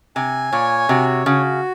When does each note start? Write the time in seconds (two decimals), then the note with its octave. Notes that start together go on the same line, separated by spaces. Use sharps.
0.16 C3 G#5
0.52 A#2 C#5
0.89 C3 F#4
1.26 C#3 F#4